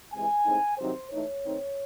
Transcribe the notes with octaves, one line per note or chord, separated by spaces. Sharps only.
C3 E3 G#3 G#5
A2 G#3 C4 D#4
C3 D#3 F#3 C4 D#4 C5
E3 A3 D#4 C#5
D#3 A3 C4 D#4